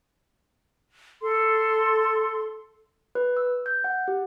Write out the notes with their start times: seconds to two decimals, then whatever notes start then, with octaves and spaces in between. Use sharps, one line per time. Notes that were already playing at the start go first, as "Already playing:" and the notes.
1.21 A4 C6
3.15 B4
3.37 E6
3.66 G6
3.84 F#5
4.08 G4